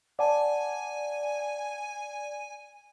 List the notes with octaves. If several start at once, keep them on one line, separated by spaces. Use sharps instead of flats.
D5 F#5 G#5 A5